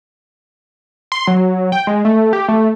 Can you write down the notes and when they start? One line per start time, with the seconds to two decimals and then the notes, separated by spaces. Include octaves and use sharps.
1.12 C6
1.27 F#3
1.72 G5
1.87 G#3
2.05 A3
2.33 G4
2.48 A3